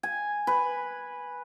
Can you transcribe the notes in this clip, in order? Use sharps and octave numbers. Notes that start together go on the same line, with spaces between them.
G#5
B4